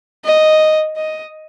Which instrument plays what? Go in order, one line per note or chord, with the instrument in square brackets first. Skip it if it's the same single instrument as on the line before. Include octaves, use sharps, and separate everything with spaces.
[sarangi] D#5
D#5